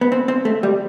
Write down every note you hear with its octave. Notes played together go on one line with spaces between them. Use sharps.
B3
C4
C4
A3
G3